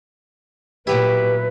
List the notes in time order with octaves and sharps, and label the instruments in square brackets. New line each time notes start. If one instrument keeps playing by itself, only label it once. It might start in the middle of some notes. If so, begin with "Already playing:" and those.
[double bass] A#2 [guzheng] F#3 B3 E4 [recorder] G4 [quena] B4